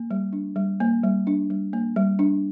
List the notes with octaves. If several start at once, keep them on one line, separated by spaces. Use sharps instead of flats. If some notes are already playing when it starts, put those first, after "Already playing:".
Already playing: A#3
G3
D4
G3
A#3
G3
D4
G3
A#3
G3
D4